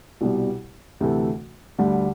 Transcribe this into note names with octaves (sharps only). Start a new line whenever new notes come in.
C2 B2 G3
D2 C3 E3 A3
D2 D3 G3